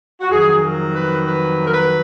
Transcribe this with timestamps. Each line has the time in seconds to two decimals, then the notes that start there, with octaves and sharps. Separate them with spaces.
0.21 F#4
0.30 F2 D#3 F#3 G#4
0.61 A#4
0.92 B4
1.23 B4
1.64 A#4
1.70 B4